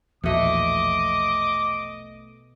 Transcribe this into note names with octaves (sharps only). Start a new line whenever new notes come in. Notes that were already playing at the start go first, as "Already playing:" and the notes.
A#1 E2 B2 F3 A3 D#5 D6